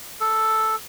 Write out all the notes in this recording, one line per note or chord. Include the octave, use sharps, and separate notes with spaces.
A4